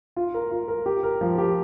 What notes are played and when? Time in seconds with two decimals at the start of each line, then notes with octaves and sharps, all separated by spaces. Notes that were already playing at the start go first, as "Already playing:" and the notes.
0.16 F4
0.34 A#4
0.51 F4
0.68 A#4
0.86 G4
1.03 A#4
1.21 F3
1.38 G4